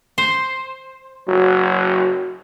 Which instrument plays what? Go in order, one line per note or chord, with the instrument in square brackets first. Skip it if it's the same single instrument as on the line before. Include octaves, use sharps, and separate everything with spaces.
[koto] C5
[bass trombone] F#1 [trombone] F#3 [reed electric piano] F#4